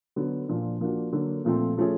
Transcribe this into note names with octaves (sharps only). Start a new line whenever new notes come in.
D3 F#3 B3
A#2 F3 A#3 D4
F3 A#3 D4 F#4
D3 F#3 A#3
A#2 F3 A3 C4
F3 A3 C#4 F4 G#4